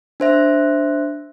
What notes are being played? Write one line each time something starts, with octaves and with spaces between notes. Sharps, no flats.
D4 C5 E5